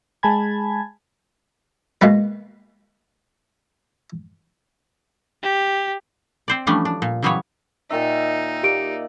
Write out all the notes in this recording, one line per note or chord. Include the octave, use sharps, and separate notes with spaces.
G#3 G#5 A5 B5 G#6
B2 G#3 A#3 B3 B4
G4
C4 C5 D5
E3 F3 G3 A3 C#4 D4
D4
A#2
C#3 E3 F#3 G3 B3 C#5
A#2 D#3 D#4 E5
A#3 G4 D5 D7